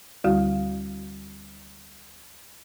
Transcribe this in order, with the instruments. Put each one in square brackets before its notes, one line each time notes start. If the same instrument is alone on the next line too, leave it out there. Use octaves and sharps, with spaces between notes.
[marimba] D2 D3 G3 E4 F#4 F5